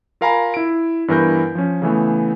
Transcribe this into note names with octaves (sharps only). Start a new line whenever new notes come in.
F4 A#4 F5 G#5 A#5 B5
E4 D7
G2 E3 B3 A#4 B5 G6
F3 C#4
C#3 E3 A3 B3